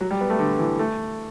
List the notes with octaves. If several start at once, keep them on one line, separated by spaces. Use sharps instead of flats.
F#3
G3
B3
A3
D3
E3
A3